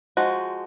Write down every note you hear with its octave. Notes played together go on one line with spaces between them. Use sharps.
F3 G#3 D#4 F#4